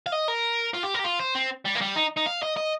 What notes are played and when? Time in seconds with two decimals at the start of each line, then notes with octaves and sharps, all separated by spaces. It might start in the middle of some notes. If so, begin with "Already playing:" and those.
0.06 F5
0.12 D#5
0.28 A#4
0.74 F4
0.83 G4
0.94 A#4
0.99 G4
1.04 F4
1.20 C5
1.35 C4
1.65 G3
1.75 A#3
1.81 G3
1.96 D#4
2.17 D#4
2.26 F5
2.42 D#5
2.57 D#5